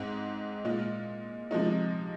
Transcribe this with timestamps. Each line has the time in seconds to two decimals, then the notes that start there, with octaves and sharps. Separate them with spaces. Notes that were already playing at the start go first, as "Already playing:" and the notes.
Already playing: G#2 G#3 C4 D#4
0.65 A#2 G#3 F4
1.51 C3 F3 G#3 D#4